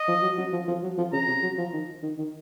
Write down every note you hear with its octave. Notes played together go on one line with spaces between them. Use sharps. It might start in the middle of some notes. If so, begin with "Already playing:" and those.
Already playing: D#5
F3
F#3
F#3
F3
F3
F#3
F3
C#3 A#5
C3
F#3
F3
D#3
D#3
D#3